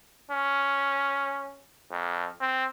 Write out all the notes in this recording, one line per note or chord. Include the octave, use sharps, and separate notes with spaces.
C#4
F2
C4